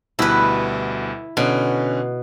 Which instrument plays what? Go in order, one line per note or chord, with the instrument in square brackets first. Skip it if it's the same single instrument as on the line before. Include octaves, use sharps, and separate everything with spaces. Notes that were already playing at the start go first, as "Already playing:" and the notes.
[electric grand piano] D2 B2 G3 [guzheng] E4 B4
[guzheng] B2 [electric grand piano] D3 C#4